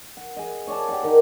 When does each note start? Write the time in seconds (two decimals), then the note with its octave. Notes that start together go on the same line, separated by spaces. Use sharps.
0.17 F#5
0.37 G#4 D#5
0.67 C#5 D5 G#5 A5
0.88 G4 D5 F#5
1.03 D#3 A#4